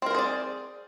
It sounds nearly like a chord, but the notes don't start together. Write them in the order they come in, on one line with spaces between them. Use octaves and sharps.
C4 A#4 C5 G#4 D5